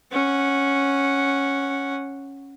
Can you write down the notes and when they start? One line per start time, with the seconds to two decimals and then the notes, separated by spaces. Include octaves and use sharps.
0.12 C#4 F#5